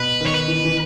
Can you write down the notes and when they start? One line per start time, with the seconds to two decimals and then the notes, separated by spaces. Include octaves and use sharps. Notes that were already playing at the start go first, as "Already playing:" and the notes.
Already playing: B2 B4
0.21 D#3
0.26 C#5
0.34 B4
0.48 E3
0.65 E3